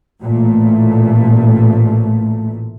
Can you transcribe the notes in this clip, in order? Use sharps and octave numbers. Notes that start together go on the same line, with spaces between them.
A1 A#2 A3